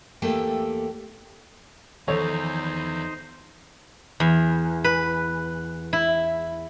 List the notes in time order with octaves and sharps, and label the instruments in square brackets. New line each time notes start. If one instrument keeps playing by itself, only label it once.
[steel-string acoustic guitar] E2 A3 A#3 G4 A4 G5
[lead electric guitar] E2 [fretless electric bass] D#3 F3 [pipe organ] D#4 C5 [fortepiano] A4 C#5
[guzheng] E2
B4
E4